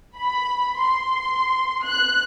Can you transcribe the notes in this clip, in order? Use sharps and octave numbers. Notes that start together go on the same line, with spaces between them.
B5
C6
F#6